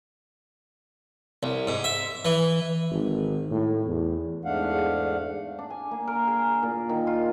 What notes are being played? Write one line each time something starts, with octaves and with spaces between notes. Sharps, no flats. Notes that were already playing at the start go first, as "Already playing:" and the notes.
C2
G#2
E5
E3
G#1
A2
E2
E2 G#2 A3 D4 F5 F#5
D4
G#5
A#3
A#4
G#4
A#2
D#3
F4